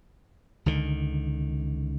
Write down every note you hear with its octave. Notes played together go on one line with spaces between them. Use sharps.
C#2 D3 D#3